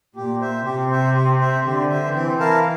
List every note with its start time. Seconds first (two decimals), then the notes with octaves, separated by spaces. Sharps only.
0.15 A#2 G4
0.41 C5 E5
0.65 C3 G4
0.91 C5 E5
1.15 G4
1.40 C5 E5
1.65 D3 G4
1.90 C5 E5
2.14 E3 C4
2.39 E4 A#4 F5 A5